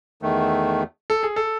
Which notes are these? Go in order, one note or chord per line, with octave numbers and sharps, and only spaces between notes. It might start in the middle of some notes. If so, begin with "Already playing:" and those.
E2 D#3 A3
A4
G#4
A4